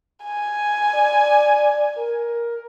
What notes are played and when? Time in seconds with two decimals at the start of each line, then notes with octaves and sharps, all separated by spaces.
0.24 G#5
0.94 D5
1.98 A#4